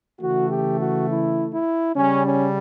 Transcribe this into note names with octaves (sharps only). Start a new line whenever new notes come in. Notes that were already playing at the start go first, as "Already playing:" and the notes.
C#3 E3 A3 F#4
G4
F#4
E4
E4
C#3 G3 C#4
C#4